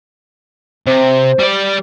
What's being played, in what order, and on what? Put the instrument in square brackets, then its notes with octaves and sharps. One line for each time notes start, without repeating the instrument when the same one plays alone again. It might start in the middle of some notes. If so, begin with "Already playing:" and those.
[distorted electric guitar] C3 [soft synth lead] C5
[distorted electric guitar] G3 D5